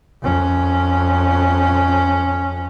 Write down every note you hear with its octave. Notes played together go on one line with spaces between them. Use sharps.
F2 C#4